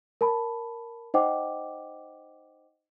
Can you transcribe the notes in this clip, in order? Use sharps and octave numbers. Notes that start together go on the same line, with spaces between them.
A#4 A5 B5
D#4 C5 D#5 F#5 G5 D6